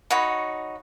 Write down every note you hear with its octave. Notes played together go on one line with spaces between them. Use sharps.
D#4 F#4 C#5 B5